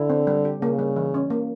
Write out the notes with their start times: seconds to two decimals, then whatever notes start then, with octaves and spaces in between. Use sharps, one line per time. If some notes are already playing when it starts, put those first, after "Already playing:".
Already playing: D3 E4
0.10 C4
0.27 G3
0.45 G4
0.61 C#3 A#3
0.79 G3
0.96 E3
1.14 C#4
1.30 A#3